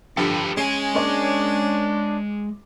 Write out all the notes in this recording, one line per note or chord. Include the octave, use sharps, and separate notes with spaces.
G2 D3 F3 G4 A4 B4
G#3 C#4 G#4 G#5
A#3 D4 C#5 D6